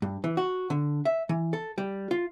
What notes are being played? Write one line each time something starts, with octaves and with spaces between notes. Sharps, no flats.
G2
E3
F#4
D3
E5
E3
A4
G3
F4